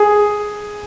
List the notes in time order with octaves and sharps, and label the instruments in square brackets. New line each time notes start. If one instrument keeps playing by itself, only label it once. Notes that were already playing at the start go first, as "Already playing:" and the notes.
Already playing: [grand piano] G#4